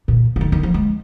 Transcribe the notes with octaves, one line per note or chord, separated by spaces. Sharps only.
A#2
F3
D#3
D#3
F3
G#3